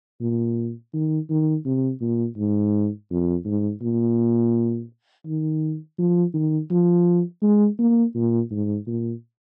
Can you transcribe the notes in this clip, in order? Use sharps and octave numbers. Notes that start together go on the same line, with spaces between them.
A#2
D#3
D#3
C3
A#2
G#2
F2
G#2
A#2
D#3
F3
D#3
F3
G#3
A#3
A#2
G#2
A#2